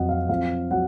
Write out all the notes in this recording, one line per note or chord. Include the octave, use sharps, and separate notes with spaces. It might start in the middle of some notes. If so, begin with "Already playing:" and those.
Already playing: F2 F#3 D#5 F#5
F5
F2 F5
F#3 F#5